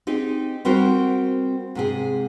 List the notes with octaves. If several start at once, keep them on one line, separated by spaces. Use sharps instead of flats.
C4 D#4 G4 G#4
G3 C4 F#4 A#4 C5
G#2 C3 G#4